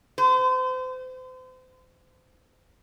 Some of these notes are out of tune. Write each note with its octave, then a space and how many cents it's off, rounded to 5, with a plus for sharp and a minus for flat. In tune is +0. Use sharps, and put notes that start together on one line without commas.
C5 -35